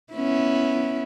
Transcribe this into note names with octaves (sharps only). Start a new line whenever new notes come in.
B3 C#4 E4